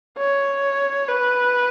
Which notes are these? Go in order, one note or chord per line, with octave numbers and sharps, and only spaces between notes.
C#5
B4